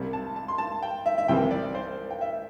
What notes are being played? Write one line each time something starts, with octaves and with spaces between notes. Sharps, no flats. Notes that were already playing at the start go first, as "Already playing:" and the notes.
Already playing: C2 C3 G3 C4
A5
A5
C6
A5
G5
E5
E5
C2 C3 E3 C4 G5
D5
C5
G5
E5